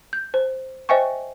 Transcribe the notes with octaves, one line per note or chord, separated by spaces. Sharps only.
G6
C5
C5 D#5 E5 G5 G#5 C#6